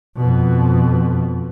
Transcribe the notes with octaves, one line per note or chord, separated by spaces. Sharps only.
F2 B2